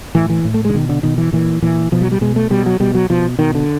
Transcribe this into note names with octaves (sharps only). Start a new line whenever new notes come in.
A2 E3
E3
A2
A3
D3 G#3
B2 D#3
D3
B2 D#3
E3
A#2 E3
A#2 E3
B2 F3
F#3
G3
B2 G#3
A3
B2 G3
F#3
B2 G3
F#3
B2 F3
B2 D#3
D3